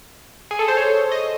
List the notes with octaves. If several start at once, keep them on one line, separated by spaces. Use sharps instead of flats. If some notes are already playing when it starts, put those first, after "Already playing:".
G#4
A4
C5
C#5
D#5